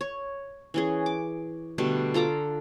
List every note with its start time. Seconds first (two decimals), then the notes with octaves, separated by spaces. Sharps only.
0.01 C#5
0.74 E3 C#4 G#4
1.06 D6
1.78 B2 D3 G3 A3
2.14 F4 A4 A#5 D6